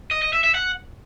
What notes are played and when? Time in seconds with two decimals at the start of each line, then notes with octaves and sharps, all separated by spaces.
0.11 D#5
0.22 D#5
0.33 E5
0.44 E5
0.55 F#5